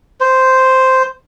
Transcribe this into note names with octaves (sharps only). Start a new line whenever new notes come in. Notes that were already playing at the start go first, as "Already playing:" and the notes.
C5